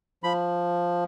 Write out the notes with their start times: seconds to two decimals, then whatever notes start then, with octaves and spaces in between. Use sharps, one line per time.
0.24 F3 B5